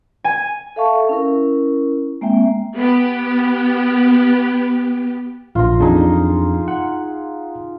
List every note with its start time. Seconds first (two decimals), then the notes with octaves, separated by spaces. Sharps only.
0.24 G#5
0.76 A4 E5 F5 A5 C#6
1.09 C#4 E4 A#4
2.21 G#3 A#3 C4 E5 G5
2.75 B3 G4
5.55 A#1 F4 A#5
5.80 F2 D4 D#4 G#4
6.68 F#5